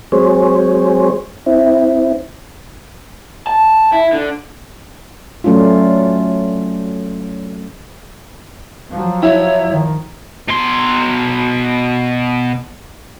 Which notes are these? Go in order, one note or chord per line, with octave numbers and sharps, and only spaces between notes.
F#3 G#3 C4 G#4 C5 C#5
C4 E4
A5
E4
D3
F#3 A3 C#4 D4 F4
F3 F#3
E4 C#5
D#3 F3
B2 C6